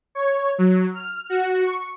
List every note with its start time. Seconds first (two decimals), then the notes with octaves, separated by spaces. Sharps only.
0.15 C#5
0.58 F#3
0.95 F6
1.30 F#4
1.64 C#6